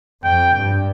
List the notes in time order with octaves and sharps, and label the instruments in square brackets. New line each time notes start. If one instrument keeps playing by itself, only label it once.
[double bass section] F2 [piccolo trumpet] G5
[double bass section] G2